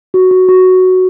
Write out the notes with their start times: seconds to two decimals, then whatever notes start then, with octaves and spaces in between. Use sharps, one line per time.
0.14 F#4
0.31 F#4
0.48 F#4